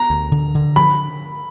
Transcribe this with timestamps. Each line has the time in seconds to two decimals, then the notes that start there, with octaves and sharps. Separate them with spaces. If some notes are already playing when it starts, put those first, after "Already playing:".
Already playing: B3 A#5
0.10 D2
0.32 D3
0.54 D3
0.76 F3 B5